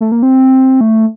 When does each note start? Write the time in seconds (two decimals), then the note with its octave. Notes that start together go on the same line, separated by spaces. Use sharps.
0.01 A3
0.12 A#3
0.23 C4
0.81 A3